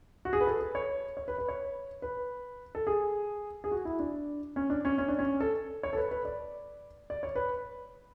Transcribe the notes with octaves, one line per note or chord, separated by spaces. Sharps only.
F#4
G#4
B4
A4
B4
C#5
C#5
B4
B4
C#5
B4
A4
G#4
G#4
F#4
E4
D4
C#4
D4
C#4
C#4
D4
C#4
A4
C#5
A4
B4
B4
D5
D5
C#5
B4